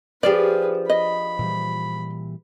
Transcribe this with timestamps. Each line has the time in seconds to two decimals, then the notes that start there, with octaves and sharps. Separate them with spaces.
0.23 F3 D4 G4 G#4 B4 D5
0.89 D#5 B5
1.39 A#2 E3 G3